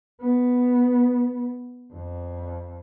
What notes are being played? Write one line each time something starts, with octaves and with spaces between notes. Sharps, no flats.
B3
F2